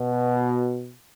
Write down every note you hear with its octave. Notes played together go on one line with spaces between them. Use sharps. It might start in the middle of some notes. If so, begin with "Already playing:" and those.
Already playing: B2